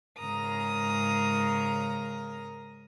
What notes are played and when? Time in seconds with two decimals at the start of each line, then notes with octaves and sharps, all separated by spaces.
0.19 G#2 C#3 A#4 A#5 D#6